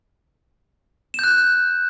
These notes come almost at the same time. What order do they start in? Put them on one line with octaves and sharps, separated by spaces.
E7 G6 F#6